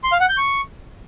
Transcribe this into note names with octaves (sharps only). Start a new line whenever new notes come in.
C6
F5
F#5
G6
C#6